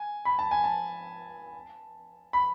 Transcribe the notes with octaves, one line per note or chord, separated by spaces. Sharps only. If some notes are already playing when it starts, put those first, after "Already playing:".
Already playing: G#5
B5
A5
G#5
A5
B5